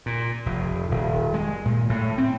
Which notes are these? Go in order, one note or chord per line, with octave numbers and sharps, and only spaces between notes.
A#2
F1
D#1
G#3
A#2
A2
C4